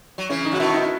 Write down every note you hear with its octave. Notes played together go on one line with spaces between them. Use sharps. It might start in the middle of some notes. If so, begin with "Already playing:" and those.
F#3
C#3 E3 C#4
D#4
C#3 F#4
B2 D#3 E4
E4